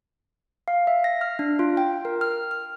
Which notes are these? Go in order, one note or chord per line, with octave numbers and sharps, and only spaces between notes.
F5
E5
A#6
F6
D4
F4
G5
A#4
F6
F6